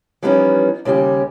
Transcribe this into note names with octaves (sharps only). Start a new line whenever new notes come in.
E3 F3 G3 B3 C#4 D#4
D#2 C#3 G3 C#4 G4